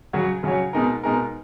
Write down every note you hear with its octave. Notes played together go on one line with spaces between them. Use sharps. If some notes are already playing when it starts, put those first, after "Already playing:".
C#3 F#3 C#4 F#4 C#5
C#3 F#3 C#4 F#4 C#5
B2 G#3 D#4 A#4
B2 G#3 D#4 A#4